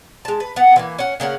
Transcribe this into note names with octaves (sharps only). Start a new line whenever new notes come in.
G#3 A5
B4
B3 F#5
E3 G#3 A#3
C#4 F#5
C#3 A#3 C#4 F#5